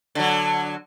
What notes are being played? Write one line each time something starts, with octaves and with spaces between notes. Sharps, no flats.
D3 F#3